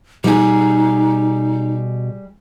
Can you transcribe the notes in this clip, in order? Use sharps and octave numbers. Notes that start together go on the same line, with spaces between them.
B2 G3 D#4 G#4